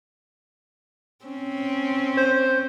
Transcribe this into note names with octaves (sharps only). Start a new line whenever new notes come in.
C4 C#4
C5